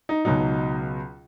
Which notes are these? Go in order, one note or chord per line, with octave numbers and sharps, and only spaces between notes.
D#4
C#2 B2 F#3 D#4